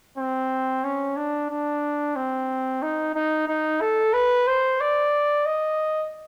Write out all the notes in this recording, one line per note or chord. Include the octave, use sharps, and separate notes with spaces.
C4
C#4
D4
D4
C4
D#4
D#4
D#4
A4
B4
C5
D5
D#5